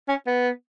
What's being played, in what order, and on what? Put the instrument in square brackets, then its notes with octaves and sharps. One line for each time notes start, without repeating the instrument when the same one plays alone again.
[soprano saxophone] C#4
B3